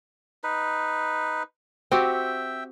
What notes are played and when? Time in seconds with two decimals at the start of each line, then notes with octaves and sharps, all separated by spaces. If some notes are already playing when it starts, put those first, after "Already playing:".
0.44 D#4 B4
1.92 C4 F#4 G4 E5 G5